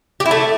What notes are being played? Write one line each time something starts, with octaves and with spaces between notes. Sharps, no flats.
G4
E4
A3